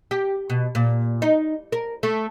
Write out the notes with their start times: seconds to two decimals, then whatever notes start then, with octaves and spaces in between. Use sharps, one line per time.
0.11 G4
0.50 B2
0.75 A#2
1.22 D#4
1.72 A#4
2.03 A3